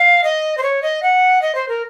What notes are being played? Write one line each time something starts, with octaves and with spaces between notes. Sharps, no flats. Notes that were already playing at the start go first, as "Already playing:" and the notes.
Already playing: F5
D#5
C5
C#5
D#5
F#5
D#5
C5
A#4